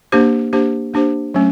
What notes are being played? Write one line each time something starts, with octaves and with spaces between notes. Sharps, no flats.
A#3 D4 G4 C5
A#3 D4 G4 C5
A#3 D4 G4 C5
F#3 A3 C#4